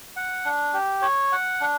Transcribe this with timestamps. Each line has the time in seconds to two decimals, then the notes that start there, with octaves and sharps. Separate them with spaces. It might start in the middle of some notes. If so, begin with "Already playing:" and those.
0.16 F#5
0.45 D4
0.73 G4
1.02 C#5
1.32 F#5
1.61 D4